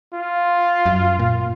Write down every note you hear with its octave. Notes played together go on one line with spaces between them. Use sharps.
F4
F#2
A#2